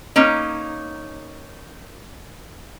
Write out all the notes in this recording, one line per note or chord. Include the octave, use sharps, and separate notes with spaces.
A#3 C#4 D#4